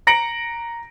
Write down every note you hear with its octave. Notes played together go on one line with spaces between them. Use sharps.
A#5 A#6 C#7 D7 F#7